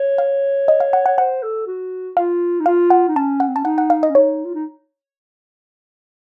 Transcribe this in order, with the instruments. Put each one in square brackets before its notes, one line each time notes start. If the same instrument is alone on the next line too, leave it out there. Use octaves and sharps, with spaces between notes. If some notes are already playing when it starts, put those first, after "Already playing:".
Already playing: [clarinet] C#5
[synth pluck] F5
D#5
F5
F#5
[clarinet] C#5 [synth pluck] F#5
[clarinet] C5 [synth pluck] F#5
[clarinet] A4
F#4
[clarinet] F4 [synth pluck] F5
[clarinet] D#4
[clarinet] F4 [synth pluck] F5
[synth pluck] F#5
[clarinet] D#4
[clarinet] C#4 [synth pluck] A5
[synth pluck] F#5
[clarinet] C4
[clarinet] C#4 [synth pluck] A5
[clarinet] D#4 [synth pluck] F#5
[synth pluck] F#5
F5
D#5
[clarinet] C#4
[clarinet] D#4 [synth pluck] C#5
[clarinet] F4
D#4